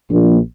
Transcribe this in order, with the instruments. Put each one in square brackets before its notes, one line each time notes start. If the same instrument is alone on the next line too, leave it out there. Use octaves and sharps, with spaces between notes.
[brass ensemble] A#1